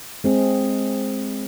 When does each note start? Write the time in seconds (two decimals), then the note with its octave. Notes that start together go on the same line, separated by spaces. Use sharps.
0.24 G#3 C4 G#4